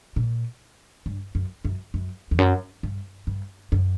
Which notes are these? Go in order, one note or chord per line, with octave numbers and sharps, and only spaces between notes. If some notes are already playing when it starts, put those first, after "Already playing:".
A#2
G2
F#2
F#2
F#2
E2
F#2
G2
G2
F#2